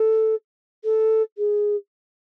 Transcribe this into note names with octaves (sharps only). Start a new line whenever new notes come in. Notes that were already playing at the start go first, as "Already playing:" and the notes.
Already playing: A4
A4
G#4